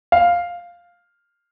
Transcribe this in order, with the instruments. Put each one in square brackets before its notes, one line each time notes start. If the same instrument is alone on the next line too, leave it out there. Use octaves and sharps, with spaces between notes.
[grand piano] F5